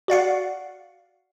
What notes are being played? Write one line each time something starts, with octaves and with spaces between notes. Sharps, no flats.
F#4 D5 F5 F#5